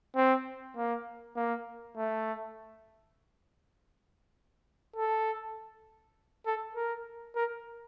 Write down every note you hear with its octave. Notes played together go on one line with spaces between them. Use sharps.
C4
A#3
A#3
A3
A4
A4
A#4
A#4